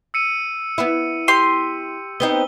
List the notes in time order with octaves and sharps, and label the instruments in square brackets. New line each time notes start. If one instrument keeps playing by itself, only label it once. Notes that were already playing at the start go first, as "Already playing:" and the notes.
[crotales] E6 C#7 D#7
[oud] B3 E4
[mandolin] G4 C6
[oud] B3 C4 D#4 [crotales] G7